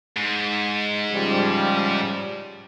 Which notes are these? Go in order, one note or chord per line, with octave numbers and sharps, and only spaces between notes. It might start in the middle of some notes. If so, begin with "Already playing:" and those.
G#2
C#3 F3 G3